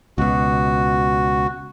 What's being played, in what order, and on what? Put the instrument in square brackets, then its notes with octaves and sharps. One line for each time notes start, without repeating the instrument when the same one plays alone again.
[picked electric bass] C#2 B2 [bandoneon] F#4